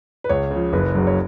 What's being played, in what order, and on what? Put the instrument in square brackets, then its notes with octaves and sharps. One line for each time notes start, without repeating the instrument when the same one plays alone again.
[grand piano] B4
C#2 C#5
C#3 F3
F#1 B4
F#2 C#3 F#3
C#5